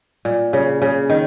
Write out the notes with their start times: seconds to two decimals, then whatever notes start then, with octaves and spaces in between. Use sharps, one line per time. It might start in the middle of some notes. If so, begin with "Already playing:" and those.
0.25 A#2
0.53 C#3
0.82 C#3
1.10 D#3